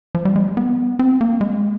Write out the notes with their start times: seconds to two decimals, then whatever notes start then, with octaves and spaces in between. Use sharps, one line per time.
0.15 F3
0.25 G3
0.36 G#3
0.57 B3
0.99 C4
1.21 A#3
1.41 G#3